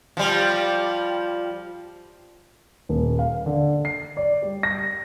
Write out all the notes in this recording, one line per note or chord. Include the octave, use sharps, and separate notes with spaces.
F3 G3
D#1
F5
D3
C7
D5
G3
A#6